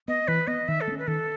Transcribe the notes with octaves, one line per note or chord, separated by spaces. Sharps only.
B3 D#5
E3 B4
B3 D#5
D#3 E5
A4
A3
C#4
B4
D#3 A4